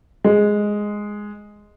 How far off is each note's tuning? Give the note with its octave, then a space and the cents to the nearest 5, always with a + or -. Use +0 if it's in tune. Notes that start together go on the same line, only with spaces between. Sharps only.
G#3 +0